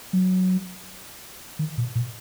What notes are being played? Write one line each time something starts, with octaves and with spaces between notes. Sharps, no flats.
F#3
D#3
A#2
A#2